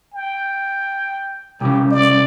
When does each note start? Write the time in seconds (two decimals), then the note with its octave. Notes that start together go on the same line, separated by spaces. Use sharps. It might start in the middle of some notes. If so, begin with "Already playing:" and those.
0.14 G5
1.61 C2 C#3 G4
1.91 D5